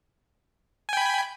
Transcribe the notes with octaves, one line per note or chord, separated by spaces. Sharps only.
G5 G#5 B5